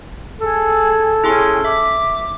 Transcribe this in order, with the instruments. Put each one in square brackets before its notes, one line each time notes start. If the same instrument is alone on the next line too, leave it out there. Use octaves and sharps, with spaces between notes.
[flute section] G#4 [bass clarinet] A4
[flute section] C#4 G#5 [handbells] E4 G#4 C6
[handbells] E5 B6 [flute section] D6